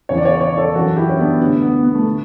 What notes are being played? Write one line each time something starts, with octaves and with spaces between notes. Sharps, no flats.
E2 C#3 E3 C#5
D5
C#5
D5
C#5
D5
A4 C#5
F#2 E3 F#4 A4
E4 G4
C#4
B3 D4
D2 D3 B3
B3
B3
A3
D3